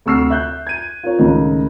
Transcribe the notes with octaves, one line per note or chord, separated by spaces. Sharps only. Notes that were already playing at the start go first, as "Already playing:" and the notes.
D2 C3 C#6 E6 F6 C7
E5 F#6 G6
G#6 D#7
F4 A#4 C#5
C#2 A2 D#3